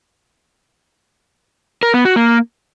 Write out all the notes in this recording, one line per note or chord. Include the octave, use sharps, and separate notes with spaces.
A#4
B3
F#4
A#3